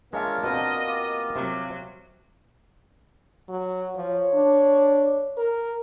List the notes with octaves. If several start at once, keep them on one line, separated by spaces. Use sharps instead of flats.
G#3 A#3 D4 F4 A#4 C#5 E5
B2 C4 D#5
F4 G4
C3 F#3
F#3
F3 C#5
D4
A#4